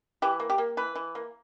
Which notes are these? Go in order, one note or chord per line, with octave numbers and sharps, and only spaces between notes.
E3 G4
A#3
G4
A#3
E3 B4
E3
A#3